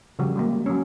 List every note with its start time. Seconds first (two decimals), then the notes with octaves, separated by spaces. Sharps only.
0.19 C#3 F3 G3 F#4
0.36 F#3 G#3 A#3
0.66 F#3 C#4